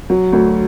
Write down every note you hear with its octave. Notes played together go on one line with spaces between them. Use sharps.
F#3
D2